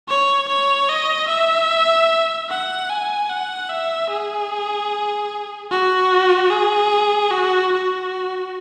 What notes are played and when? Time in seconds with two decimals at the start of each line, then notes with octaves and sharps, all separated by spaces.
0.08 C#5
0.49 C#5
0.89 D#5
1.28 E5
2.49 F#5
2.89 G#5
3.29 F#5
3.70 E5
4.10 G#4
5.71 F#4
6.50 G#4
7.31 F#4
7.72 F#4